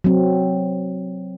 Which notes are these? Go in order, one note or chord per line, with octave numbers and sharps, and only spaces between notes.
F#3 C4